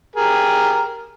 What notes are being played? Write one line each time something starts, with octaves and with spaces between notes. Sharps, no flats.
G4 G#4 A#4